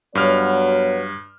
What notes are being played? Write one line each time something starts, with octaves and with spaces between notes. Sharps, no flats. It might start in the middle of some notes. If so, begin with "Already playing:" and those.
G2 F#3 B3 C#5 F6